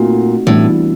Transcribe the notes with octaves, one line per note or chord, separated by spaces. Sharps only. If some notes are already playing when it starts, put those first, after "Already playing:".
Already playing: A#2 A3 C4 D#4 F#4
A2 E3 G3 B3 D4